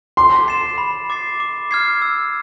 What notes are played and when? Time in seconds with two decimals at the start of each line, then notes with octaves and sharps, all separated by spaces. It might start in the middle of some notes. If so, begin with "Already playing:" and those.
0.17 C6 D6
0.48 A6 C7 E7
0.78 B5
1.10 D6 A6 C7
1.40 D6
1.71 F6 G#6 C7
2.02 E6